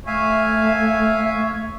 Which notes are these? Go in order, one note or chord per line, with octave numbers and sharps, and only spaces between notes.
A3 C#5 E5 F5 G#5